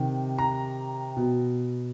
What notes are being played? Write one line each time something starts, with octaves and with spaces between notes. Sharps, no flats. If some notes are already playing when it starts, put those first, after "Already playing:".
Already playing: C3 D#3
A#5
B2